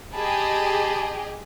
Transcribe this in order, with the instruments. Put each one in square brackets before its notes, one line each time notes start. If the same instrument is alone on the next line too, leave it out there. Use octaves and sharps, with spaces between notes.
[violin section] G4 G#4 D#5 [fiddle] A5 B5